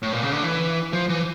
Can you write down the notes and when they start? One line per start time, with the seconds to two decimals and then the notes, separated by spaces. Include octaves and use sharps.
0.03 A2
0.12 A#2
0.23 C#3
0.32 D3
0.43 E3
0.93 F3
1.09 E3